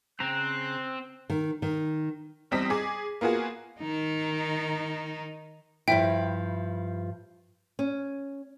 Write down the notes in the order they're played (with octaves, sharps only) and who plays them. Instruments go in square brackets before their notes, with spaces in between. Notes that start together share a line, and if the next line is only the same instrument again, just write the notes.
[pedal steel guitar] C#3 A#5 [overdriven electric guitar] C4 [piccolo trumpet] F#6
[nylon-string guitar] D#3
D#3
[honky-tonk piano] E2 G3 C4 D#5 A#6 B6
G#4 D6
A#3 B3 F4 F#4 G#4
[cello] D#3 D#4
[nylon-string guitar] G2 F3 E4 [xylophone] E5 G5
[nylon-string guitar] C#4